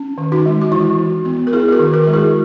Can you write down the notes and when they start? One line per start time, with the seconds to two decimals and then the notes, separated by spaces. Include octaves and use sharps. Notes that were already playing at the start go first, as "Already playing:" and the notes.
Already playing: C#4
0.18 D#3
0.32 D#4 F#4
0.46 G#3
0.61 F#4
0.72 E3 E4
0.99 E3
1.25 B3
1.47 A#4
1.52 B3 E4 G#4
1.68 G#4
1.72 F#4 A#4
1.79 D#3
1.93 F#4 A#4
2.04 G#3 A#4
2.13 E4 G#4